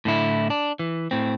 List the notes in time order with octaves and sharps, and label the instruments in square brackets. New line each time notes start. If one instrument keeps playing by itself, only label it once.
[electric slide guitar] A2 D3 E4
D4
E3
A2 C4